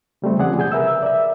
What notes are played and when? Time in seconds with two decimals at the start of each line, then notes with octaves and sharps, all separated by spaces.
0.22 C#3 G3 A3 C4
0.38 E2 C#3 F3 G#4 D5 F#5
0.58 C3 G#4 G#5 G6
0.72 A#4 B4 E5 E6
1.02 D5 E5